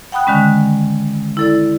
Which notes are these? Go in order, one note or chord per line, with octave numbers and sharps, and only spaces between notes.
F#5 G5 B5 D#6 F#6
D3 D#3 G#3 C#4
E4 A4 D5